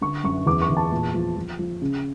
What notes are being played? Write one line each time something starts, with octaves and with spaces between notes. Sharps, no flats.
D3 C#6
F#2 C#6
E2 D6
C#6
E2
A5
A#2
F3
F3
F3
C#3